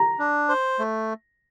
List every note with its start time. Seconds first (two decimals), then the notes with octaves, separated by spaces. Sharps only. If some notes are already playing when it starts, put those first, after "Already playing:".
Already playing: A#5
0.19 D4
0.49 C5
0.79 A3